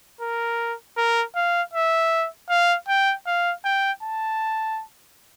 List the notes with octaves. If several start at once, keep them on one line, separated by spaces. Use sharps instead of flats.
A#4
A#4
F5
E5
F5
G5
F5
G5
A5